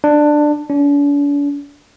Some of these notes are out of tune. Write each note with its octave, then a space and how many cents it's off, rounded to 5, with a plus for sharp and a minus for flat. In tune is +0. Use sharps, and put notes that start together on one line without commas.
D4 +15
D4 -45